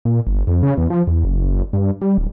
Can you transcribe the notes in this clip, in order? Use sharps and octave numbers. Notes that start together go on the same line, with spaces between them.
A#2
G1
F2
C#3
E2
F3
E2
F#1
G2
G3
D1